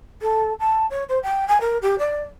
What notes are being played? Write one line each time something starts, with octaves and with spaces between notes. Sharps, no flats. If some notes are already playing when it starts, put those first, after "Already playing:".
A4
A5
C#5
C5
G5
G#5
A#4
G4
D5